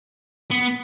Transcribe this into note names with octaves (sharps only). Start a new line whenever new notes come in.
B3